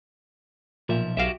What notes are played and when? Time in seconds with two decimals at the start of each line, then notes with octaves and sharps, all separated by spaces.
0.89 B1 A#2 F3 E5
1.17 B1 F#4 G4 E5 F5